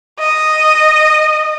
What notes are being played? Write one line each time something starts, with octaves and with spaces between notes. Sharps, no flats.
D#5